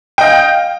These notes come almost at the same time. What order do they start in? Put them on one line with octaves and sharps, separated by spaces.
G5 D#5 F5